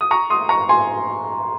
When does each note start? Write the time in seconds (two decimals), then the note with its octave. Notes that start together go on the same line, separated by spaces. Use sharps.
0.01 D#6
0.11 A#5 C#6
0.30 C6 D#6
0.49 A#5 C#6
0.69 G#5 C6